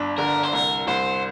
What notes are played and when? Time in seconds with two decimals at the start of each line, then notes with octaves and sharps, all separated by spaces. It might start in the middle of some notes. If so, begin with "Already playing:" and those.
Already playing: G1 D4
0.18 D3 A#4
0.43 C5
0.53 C2 A#4
0.87 C2 C5